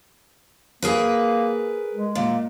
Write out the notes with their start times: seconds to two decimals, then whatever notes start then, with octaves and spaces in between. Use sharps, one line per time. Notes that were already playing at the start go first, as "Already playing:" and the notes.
0.82 A#3 G#4 A#4 B4
1.93 G#3
2.15 A#2